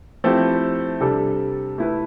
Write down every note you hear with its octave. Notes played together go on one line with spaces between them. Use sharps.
F3 A3 C4 E4 G4
C3 G3 D4 A4
A3 E4 B4